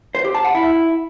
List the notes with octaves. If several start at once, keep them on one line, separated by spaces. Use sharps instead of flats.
C5
G4
A5
F#5
E4